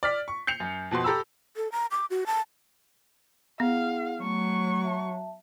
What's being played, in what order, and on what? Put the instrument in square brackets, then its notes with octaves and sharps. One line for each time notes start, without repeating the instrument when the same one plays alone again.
[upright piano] D5 F6 B6
C#6
G6 C7 C#7 F7
F#2
F2 B2 F#4 C6
G4 A4 A#5 B5 E6
[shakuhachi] A4
A#5
D6
F#4
A5
[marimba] B3 [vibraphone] E4 G#4 F#5 [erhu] F5
[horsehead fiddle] F#3 [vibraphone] A3 [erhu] C#6
[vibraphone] E5 A5